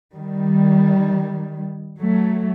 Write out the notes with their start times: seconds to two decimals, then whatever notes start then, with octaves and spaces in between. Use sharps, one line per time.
0.14 D#3 G3
1.98 F#3 A3